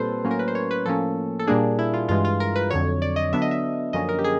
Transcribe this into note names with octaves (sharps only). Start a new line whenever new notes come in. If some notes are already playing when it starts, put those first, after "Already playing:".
Already playing: A#2 G3 C4 A4 B4 C5
A2 F#3 A#3 C#4
A#4
B4
C5
C#5
B4
A2 F3 A#3 C#4 A4
A4
A#2 G3 A#3 D4 G#4
E4
F4
G2 E3 G#3 F4
F4
A#4
B4
F2 D3 F#3 C#5
D5
D#5
D3 F#3 B3 D4 E5
D#5
E5
F#2 D3 F3 A#3 C#4 D#5
A#4
G4
G#4